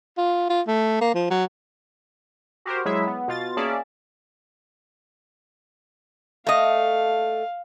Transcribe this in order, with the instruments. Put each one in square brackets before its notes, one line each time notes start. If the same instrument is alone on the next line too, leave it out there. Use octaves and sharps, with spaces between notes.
[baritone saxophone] F4
F4
A3
A#3
F3
F#3
[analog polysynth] F#4 G4 A#4 C5
F#3 G#3 E4 G#4 E5
B3
B2 F4 A6
A#3 C#4 G#4 D5 E5 A5
[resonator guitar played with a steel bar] A3 D#5 [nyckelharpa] F5